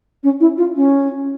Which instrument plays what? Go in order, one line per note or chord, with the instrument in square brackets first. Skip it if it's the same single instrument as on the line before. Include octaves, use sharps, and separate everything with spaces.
[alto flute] C#4
E4
F4
C#4